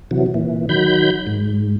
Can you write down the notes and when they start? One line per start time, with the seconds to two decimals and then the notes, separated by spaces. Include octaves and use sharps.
0.11 C3 E3 F#3
0.34 A#2 E3
0.69 D#3 F#3 B5 G6
1.27 G#2